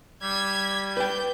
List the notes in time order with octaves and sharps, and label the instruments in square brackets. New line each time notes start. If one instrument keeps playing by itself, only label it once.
[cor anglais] G3 [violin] G#6 B6
[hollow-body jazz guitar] B4 G5 [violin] G6